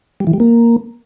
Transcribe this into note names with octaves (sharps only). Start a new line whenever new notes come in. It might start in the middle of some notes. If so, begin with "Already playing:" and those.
G3
E3
G3
A#3